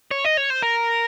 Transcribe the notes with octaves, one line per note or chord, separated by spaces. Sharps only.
C#5
D#5
C#5
C5
A#4